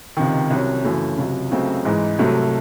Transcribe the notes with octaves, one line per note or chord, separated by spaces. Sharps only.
C#2 C3 D#3
C2 C3 F#3 C#4
F#2 C#3 E3 A3
C#2 C3 F#3
C#2 C#3 F#3 A3 C4
G#2 E3 G#3 D#4
C2 C3 F#3 A3